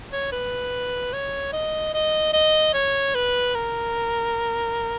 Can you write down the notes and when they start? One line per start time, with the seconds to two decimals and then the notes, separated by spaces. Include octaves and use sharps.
0.12 C#5
0.32 B4
1.13 C#5
1.53 D#5
1.94 D#5
2.33 D#5
2.74 C#5
3.15 B4
3.54 A#4